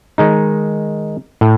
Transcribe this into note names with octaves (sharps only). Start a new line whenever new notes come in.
D#3 G#3 D#4
A2